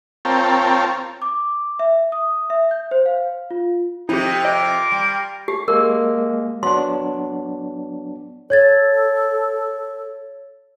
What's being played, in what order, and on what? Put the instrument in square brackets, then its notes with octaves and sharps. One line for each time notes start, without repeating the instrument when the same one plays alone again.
[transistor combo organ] C4 F4 A#4 C#5 G5 A5
[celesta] D6
E5
D#6
E5
G6
C5
F5
F4
[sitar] F2 C3 [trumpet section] D#4 [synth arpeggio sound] E4 G4
[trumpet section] F4 A#4 D6 [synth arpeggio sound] D#5
[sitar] G3
[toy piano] G4
[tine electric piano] G#3 A#3 [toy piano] A#4
[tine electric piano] F#3 B3 D4 [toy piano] C6
[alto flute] A4 [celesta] C#5 G#6 A6